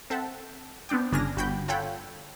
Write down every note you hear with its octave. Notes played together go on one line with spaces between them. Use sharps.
C4 A4 E5 F#5
B3 C4 D4 D5 G5
G1 C#3 D4 G#5 F6 A#6
G1 F#4 G5 B5 G6
F4 A4 C#5 F#5 G5 B5